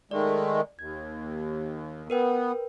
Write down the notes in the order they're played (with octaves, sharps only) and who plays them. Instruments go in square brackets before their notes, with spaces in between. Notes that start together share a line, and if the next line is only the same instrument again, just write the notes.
[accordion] D#3 G#3 A3 [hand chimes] D5
[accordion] D#2 [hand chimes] G#6
[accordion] B3 [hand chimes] A#4 B4 G5